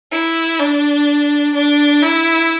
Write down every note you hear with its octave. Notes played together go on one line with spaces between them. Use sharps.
E4
D4
D4
E4